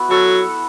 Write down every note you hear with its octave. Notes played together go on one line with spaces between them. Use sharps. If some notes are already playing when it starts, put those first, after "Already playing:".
Already playing: B3 E4 F#4
F#3 A4